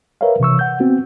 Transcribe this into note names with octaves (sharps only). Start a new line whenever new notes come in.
A#4 B4 C#5 E5 F5
C3 E3 C#6 E6
F#5 G6
B3 C4 F#4